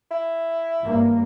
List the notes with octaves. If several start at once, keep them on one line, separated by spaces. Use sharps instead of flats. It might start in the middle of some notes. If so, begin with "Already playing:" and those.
E4
G#1 G2 A#3